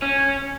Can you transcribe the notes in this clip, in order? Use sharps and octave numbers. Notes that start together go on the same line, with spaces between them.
C#4